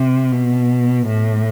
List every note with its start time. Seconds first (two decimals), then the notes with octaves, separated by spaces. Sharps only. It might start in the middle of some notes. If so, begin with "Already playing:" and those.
Already playing: C3
0.32 B2
1.07 A2